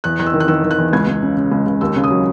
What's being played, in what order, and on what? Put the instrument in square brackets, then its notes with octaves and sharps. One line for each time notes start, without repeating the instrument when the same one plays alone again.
[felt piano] E2 F#6
E2 F#6
E6
D#3
F#6
D#3 E6
D#3
F#6
E2
C#2 G#6
C#2
C#3
C#3
C#2
C#2
D#2 E6
C#3
D#6
F#3